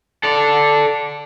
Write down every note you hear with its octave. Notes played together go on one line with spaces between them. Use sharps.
A4 D5